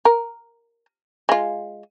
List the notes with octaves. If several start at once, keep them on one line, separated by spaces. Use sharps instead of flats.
A#4
G#3 F4